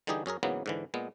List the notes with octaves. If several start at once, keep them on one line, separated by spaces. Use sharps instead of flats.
D3 E3 G3 D#4 G4 G#4
F#2 C#4 G#4 A#4
G#2 C#3 E3 F#3 A#3 B3
G#2 D3 E3
A#2 G#3 B3